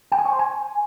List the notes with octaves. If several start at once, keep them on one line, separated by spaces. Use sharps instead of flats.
G5
G#5
C#5
C5
G#5